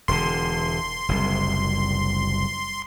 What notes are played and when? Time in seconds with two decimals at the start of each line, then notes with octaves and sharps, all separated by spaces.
0.08 E1 D3 C6
1.09 F#1 C2